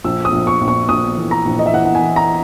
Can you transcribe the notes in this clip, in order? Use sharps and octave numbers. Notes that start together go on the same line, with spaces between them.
A#1 E6
D#6
A#1
C#6
A#1
C#6
A#1 D#6
E3
A#5
A#1
D#5
E5
E3 F#5
F#5
G#5
E3
A#5